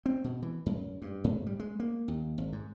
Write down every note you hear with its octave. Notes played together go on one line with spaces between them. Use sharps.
C4
B2
E3
F#2
G2
G#2
G3
G#3
A#3
D#2
G#1
G#2